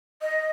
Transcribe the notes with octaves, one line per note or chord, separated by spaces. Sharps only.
D#5